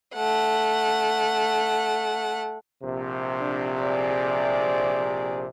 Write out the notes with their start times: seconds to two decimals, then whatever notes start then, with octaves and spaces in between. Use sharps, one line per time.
0.15 A3 F#5
2.83 A#1 C3
3.39 D4
3.81 G#4 D5